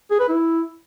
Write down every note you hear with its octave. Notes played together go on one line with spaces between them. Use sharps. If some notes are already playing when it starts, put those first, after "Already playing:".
G#4
B4
E4